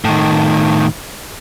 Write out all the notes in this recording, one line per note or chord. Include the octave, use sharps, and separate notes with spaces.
A2 D#3